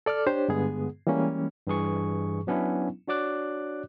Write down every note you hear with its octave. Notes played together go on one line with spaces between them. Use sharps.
A4 D5 D6 F6
D4 G4 C5 C#5
G2 D3 G#3 B3 G#4
E3 G3 G#3 A#3 C#4
G2 E3 G#4 C#6
F#3 B3 C#4 D4 E4
D4 F#4 C#5 D5 D6 F#6